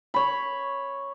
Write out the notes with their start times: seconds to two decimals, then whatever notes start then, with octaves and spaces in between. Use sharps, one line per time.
0.14 C#5 B5